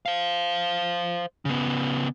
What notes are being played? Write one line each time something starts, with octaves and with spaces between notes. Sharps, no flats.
C5 F5
C#3 B3